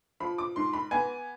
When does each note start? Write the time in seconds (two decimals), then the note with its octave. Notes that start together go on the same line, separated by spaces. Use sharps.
0.20 F3 B5
0.38 D6
0.56 G#2 C6
0.73 B5
0.91 B3 G#5